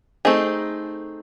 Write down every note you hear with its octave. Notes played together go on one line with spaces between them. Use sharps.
A3 C4 D#4 G#4